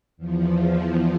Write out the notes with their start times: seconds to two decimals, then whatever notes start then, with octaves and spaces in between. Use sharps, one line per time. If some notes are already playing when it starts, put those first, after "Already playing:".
0.17 E2 F3